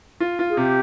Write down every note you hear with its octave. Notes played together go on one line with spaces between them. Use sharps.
F4
F4
G#4
C3 G4